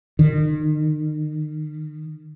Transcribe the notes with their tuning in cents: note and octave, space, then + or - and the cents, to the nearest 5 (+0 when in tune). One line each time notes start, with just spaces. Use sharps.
D#3 -30